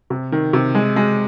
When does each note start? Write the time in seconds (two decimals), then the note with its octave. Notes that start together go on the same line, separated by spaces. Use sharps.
0.10 C3
0.32 D#3
0.53 C3
0.75 G#3
0.96 G#3